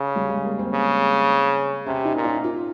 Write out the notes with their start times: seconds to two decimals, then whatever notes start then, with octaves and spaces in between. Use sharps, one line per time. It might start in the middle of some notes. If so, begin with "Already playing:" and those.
Already playing: C#3
0.16 G3
0.30 G#3
0.45 A#3
0.59 C4
0.73 C#3
1.86 C3 C#4
2.05 D#4
2.15 A#2
2.25 D#4
2.44 F4